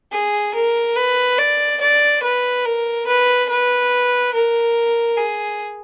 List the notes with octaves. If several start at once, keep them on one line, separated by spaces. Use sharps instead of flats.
G#4
A#4
B4
D5
D5
B4
A#4
B4
B4
A#4
G#4